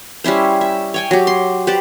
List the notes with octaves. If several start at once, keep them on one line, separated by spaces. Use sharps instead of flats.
G3 C#4 E4 C5
E5
C#5 G5 G#5
F#3 G4
C6
G4 B4 C5 D5